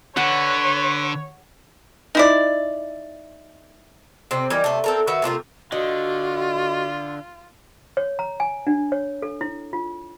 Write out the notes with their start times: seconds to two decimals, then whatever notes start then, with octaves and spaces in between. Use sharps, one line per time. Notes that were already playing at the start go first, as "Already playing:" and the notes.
0.17 D3 B4 C#5 F#5
2.15 D#4 E4 D5
4.31 C3 C4
4.50 E3 G3 D#4 A#4
4.64 C3 A3
4.84 C4 A4 A#4
5.07 D#3 F#4 B4 E5
5.22 C3 A3 F4 A#4
5.72 D3 F4 F#4 D#5
7.97 C#5
8.19 A#5
8.40 G#5
8.67 D4
8.92 C#5
9.22 A4
9.41 E4
9.73 F4